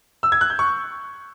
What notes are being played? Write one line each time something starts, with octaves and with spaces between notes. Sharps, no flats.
E6
G#6
F#6
G6
C#6